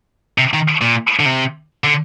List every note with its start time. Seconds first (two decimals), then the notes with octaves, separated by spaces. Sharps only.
0.38 C3
0.54 D#3
0.81 A#2
1.20 D3
1.26 C3
1.84 D3